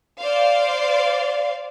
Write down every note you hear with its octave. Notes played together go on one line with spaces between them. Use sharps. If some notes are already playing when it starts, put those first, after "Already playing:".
C5 D5 F5